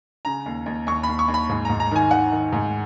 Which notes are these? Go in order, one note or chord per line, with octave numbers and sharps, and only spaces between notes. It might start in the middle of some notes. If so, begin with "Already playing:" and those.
C#3 A#5
D#2
D#2
D#2 C#6
B5
D#2
C#6
D#2
B5
G#2
A#5
G#2
A#5
D#3 G#5
D#3 F#5
D#3
G#2